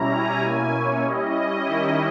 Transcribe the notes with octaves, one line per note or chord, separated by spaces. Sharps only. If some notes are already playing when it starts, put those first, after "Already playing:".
Already playing: B2 G3 C#4 E4 A#5
G#5
B2 A#3 C#4 E4
C#5
G3 C#4 E4 D#5
D#5
D#3 G3 C#4 E4